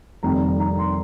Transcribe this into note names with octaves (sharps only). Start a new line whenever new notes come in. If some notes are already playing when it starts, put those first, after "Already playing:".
F1 F2 D#3 G3 A#5
A#5
C6